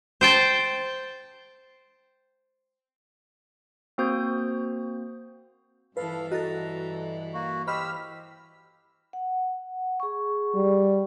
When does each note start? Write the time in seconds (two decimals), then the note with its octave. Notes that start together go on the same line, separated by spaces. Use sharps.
0.21 C5 G5 A5
3.98 A#3 C4 F#4 C5 D#6 G6
5.97 G2 E3 F3 A4 B4 F5
6.31 F#4 A4 D#5 A#5
7.34 A#3 F#4
7.67 G4 C5 D#5 B5 E6 F6 B6
9.13 F#5
10.00 G#4 C#6
10.54 G3